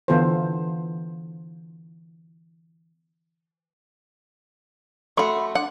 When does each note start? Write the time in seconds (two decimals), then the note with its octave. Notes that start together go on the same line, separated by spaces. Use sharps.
0.08 D3 E3 B3 F4 A4 C5
5.17 A3 F#4 F#5 B5 C6
5.55 D4 F#5